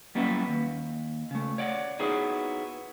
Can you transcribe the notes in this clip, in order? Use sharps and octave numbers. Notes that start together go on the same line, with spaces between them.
F#3 G3 A#3 B3 C#4 E4
D#2
C#3 A3
C#5 D5 F#5
B3 D#4 E4 F#4 G#4 C#5